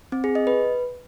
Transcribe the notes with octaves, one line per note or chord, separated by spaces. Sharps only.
C4
G#4
D#5
B4